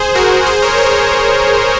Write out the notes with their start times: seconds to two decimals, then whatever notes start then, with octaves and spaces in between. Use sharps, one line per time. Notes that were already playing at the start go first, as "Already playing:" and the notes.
Already playing: G#4 C5
0.15 F#4 A#4
0.46 G#4 C5
0.62 A#4 C#5
0.77 A#4 C#5